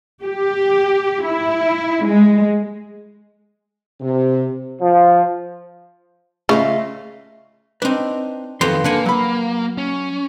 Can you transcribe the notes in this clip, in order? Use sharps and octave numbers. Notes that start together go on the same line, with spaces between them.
G4
E4
G#3
C3
F3
C#3 A3 F4 D#5 F5
C4 D4 D#4 B4
F2 D#3 F#3 B3 A#5 C6
D3 A#3 B4 F#5 G#5
F#3 B5
C#4